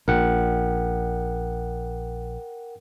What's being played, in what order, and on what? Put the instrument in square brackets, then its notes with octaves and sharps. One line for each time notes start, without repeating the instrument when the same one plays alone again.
[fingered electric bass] A#1 A#2 [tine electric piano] A#4 F#5 G5